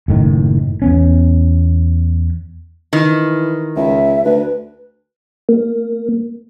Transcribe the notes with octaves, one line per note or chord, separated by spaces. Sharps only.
F#1 A2 D#3
E2 B3 C#4
D#3 E3
C#2 E5
D2 B4
A#3